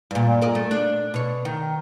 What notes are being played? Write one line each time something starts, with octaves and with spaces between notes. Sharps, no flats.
G2 A#2
A#4 D5 D#5
A3
D4
B2 C#5
D#3